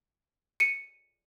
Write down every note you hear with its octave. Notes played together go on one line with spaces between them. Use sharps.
C#7 D#7